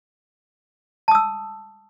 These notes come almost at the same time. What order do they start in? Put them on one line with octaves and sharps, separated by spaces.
A5 D#6 E6